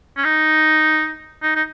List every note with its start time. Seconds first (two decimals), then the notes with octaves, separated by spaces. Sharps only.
0.17 C#4
0.25 D#4
1.43 D#4
1.55 D#4